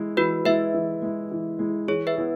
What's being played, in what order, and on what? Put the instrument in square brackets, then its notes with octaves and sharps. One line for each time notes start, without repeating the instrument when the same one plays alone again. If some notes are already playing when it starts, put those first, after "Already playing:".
Already playing: [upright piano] E3 G#3 E4
[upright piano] E3 [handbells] F#4 B4
[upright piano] G#3 E4 [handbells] B4 E5
[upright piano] E3
G#3 E4
E3
G#3 E4
[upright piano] E3 [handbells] G#4 C#5
[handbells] B4 E5
[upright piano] B3 E4 G#4